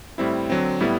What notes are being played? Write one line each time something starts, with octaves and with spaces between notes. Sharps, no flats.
A2 G3 C4 E4
D3 F#3 C4
A2 G3 B3 E4